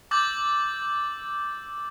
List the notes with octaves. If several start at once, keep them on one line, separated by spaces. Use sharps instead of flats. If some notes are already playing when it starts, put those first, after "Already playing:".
D6 E6 G6 A6 F#7